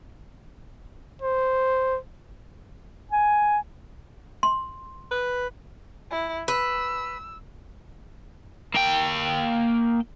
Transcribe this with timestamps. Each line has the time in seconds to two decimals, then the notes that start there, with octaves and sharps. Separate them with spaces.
1.22 C5
3.11 G#5
4.43 C6
5.11 B4
6.11 E4
6.48 B4 E6
8.75 A#3 G5